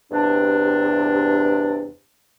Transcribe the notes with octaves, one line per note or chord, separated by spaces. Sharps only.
E2 G2 C3 D4